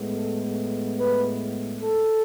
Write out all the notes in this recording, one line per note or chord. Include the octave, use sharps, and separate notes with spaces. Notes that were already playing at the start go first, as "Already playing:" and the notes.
Already playing: A2 G#3 B3
A4
B4
A4